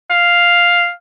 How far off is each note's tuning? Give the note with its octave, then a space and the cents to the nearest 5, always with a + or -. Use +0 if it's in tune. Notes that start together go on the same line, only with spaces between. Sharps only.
F5 +0